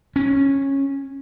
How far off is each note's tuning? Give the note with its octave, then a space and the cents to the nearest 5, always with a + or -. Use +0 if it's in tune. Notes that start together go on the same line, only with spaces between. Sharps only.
C#4 -15